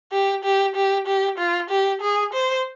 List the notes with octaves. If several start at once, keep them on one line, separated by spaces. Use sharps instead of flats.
G4
G4
G4
G4
F4
G4
G#4
C5